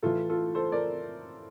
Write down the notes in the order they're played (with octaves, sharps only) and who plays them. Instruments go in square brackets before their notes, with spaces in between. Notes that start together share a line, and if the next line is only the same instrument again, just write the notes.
[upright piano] A2 E3 F4 A4
F4 A4
A4 C5
A#4 D5